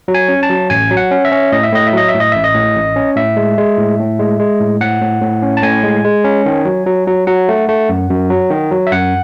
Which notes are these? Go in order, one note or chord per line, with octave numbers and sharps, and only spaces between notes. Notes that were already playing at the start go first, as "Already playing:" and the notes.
F#3
G#5
C#4
A5
F#3
A1 G#5
F#3
F#5
C#4
E5
C#4
A2 D#5
E5
A2 D#5
E5
F#3 D#5
E5
A2
D#5
A1 E5
D#5
A2
A1
C#4
A2 E5
G#3
G#3
A2
A2
G#3
G#3
A2
A2 F#5
A2
A2
C#4
A5
A2 G#5
G#3
G#3
C#4
D#3
F#3
F#3
F#3
F#3 F#5
A3
A3
F#2
F#2
F#3
D#3
F#3
E5
F#2 F#5